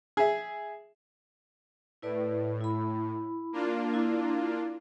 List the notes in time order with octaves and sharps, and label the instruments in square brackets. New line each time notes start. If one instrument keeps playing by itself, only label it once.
[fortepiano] G#4 E5
[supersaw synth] A2 [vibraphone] E4 B4 D5
[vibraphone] E4 B5
[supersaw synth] A#3 D4 F4
[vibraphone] E4